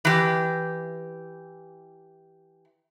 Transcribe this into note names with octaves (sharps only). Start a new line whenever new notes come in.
E3 G4